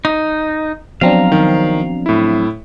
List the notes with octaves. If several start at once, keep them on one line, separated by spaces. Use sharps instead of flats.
D#4
F3 F#3 B3 C4 D4 F5 A#5
D#3
A2 E4